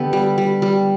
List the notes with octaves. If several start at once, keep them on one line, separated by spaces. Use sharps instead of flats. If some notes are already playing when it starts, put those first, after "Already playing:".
Already playing: D3 B3 G4 A4 B4
G3
G3
G3